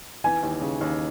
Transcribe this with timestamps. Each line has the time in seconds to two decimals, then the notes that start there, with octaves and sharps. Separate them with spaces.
0.24 E3 G#5
0.43 D#2
0.61 C#3
0.81 D#2